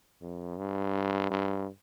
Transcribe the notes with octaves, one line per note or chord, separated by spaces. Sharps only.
F2
G2
G2